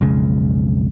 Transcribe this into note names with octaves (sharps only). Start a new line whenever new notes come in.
B1 F2 C#3 G#3